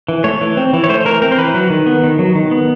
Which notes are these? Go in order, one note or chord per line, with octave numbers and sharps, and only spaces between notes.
E3
A3 C#5
E3
C4
E3
C#5
A3 C5
E3 A#4
C4 A#4
C5
E3 B4
F#3
D#3
B3
D#3
F#3
D#3
B3